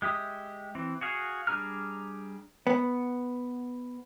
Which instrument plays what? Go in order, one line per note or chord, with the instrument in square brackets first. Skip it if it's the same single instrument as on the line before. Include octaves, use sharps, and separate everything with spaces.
[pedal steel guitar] G#3 G4 E5 D#6
E3 C4
F#4 G#4 F5
G3 D4 G#4 A#5 F6
[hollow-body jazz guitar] B3